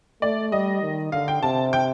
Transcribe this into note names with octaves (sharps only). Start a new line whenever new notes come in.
A3 D5
G3 D#5
D#3
D3 F5
G5
C3 A5
G5